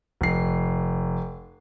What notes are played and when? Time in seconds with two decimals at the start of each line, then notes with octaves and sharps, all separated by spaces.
0.21 F1 C7